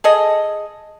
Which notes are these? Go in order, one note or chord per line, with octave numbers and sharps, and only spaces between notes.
G#4 A4 D#5